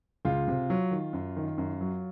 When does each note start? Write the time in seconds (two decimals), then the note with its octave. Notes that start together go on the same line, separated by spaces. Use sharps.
0.25 C#2 F4
0.48 C3
0.70 F#3
0.91 D#3
1.13 F#2
1.36 D#3
1.58 F#2
1.81 F#3